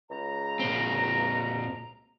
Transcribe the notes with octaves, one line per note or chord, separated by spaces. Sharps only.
C#2 A#5
A#2 C4